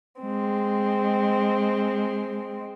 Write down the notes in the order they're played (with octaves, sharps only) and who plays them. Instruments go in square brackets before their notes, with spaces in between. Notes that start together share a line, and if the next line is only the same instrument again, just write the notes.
[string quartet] G#3 C4